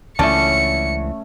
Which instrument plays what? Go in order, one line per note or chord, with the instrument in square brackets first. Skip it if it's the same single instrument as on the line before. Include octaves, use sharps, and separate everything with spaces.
[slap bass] C#2 E3 [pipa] D3 D5 A5 [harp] A3 C#4 [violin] C#7